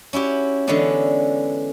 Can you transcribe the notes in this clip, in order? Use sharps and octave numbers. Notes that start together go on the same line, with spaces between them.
C#4 E4 F#4 G4
D3 E3 G#3 B3 C#4 D4